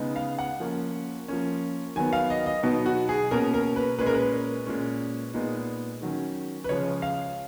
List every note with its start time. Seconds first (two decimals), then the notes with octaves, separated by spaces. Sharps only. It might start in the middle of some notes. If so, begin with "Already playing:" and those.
Already playing: C#3 G#3 B3 D#4
0.16 F5
0.38 F#5
0.60 F3 A#3 C#4
1.28 F3 A#3 C#4
1.96 D#3 F#3 B3 G#5
2.13 F5
2.30 D#5
2.46 D#5
2.63 B2 F#3 B3 D#4
2.86 F#4
3.09 G#4
3.31 B2 A#3 C#4 A#4
3.54 A#4
3.76 B4
3.98 A#2 G#3 C#4 B4
4.07 A#4
4.14 B4
4.67 A#2 G#3 C#4
5.33 A#2 G#3 B3 D#4
6.02 D#3 F#3 C#4
6.64 B4
6.69 C#3 F3 G#3 C#5
7.02 F5